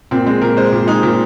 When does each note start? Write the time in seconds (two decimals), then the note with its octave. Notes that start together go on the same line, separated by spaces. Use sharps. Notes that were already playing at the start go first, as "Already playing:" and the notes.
0.11 A#2 C4
0.26 G#3 C4
0.41 A#2 A#4
0.57 G#3 C5
0.72 A#2
0.87 G#3 D#4
1.03 A#2